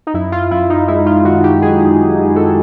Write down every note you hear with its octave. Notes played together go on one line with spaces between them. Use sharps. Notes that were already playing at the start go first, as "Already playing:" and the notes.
D#4
F#2 E4
F4
F#2 E4
D#4
G#3 E4
F4
D#3 F#4
G4
F#2 G#4
F#2
G#3 A4